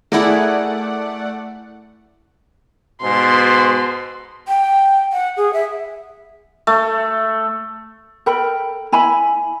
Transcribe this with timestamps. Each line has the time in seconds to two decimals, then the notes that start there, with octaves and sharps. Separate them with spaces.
0.12 A3 E4 G#4 A#4 D5 F#5
3.02 G#2 B2 C6
4.48 G5
5.13 F#5
5.37 G#4
5.53 E5
6.67 A3
8.26 A4 A#4 G5 B5
8.92 E4 G#5 B5